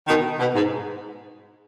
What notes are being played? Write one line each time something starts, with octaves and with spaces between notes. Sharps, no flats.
B2 D#3
B2
G#2